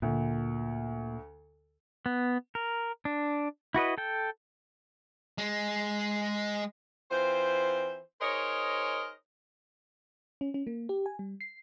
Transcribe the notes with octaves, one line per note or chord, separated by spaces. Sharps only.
D2 A#2
B3
A#4
D4
E4 F#4 B4 D#5
A4 G5
G#3
E3 C4 F4 C5
D#4 G#4 A#4 C5 C#5 D#5
C#4
C#4
A#3
G4
G#5
G3
C7